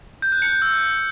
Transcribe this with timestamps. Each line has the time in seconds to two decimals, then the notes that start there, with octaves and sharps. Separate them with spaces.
0.22 G6
0.32 F#6
0.42 C#7
0.52 G6
0.62 E6